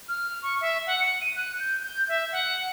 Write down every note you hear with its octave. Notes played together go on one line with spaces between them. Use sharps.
F6
C#6
E5
F#5
C#7
D#7
F#6
G6
G6
E5
F#5